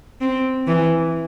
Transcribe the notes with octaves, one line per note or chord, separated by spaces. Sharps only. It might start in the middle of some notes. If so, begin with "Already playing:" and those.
C4
E3